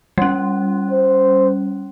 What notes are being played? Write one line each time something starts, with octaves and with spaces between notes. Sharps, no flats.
G3 C#4
C5